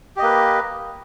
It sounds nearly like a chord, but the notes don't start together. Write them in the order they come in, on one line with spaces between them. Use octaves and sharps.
G4 D#5 A#3 B4